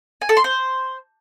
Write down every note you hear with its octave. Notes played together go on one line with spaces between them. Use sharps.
G#5
A4
C6
C5